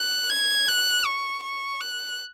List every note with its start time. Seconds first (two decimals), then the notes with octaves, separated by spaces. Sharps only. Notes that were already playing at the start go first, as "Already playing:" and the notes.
Already playing: F#6
0.30 G#6
0.68 F#6
1.05 C#6
1.43 C#6
1.81 F#6